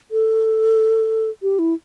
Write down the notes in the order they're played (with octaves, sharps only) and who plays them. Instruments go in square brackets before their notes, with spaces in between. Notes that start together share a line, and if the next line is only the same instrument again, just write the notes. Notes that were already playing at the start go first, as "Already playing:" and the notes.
[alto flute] A4
G4
E4